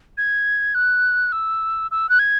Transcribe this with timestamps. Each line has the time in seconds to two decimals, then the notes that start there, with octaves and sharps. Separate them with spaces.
0.18 G#6
0.75 F#6
1.32 E6
1.91 E6
2.09 F#6
2.19 G#6